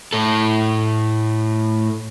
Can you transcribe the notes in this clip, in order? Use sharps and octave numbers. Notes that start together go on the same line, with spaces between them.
A2 A4